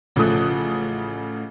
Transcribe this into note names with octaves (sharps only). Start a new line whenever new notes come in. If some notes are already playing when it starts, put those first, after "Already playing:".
A1 C#3 F3 A3 D#6 F#6